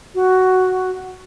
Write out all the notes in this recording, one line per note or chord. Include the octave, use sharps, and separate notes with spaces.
F#4